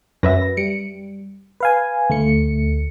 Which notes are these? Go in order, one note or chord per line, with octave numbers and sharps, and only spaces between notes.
F#2 B4 E5 A#6
G3 C#7 D7
B4 F5 G#5
D2 A3 C#7